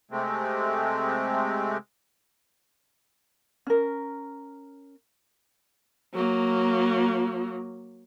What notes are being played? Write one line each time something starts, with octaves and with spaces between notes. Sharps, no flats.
C3 G#3 A3 C4
C#4 A#4
F#3 A#3